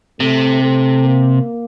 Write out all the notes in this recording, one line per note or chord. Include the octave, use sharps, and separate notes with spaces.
C3 A3
A3
A#3